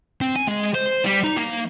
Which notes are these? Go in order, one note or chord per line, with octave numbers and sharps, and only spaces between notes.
C4
G#5
G#3
C5
G3
D#4
A#3